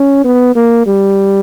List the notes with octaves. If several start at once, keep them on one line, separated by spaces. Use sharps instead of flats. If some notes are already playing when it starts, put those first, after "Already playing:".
Already playing: C#4
B3
A#3
G3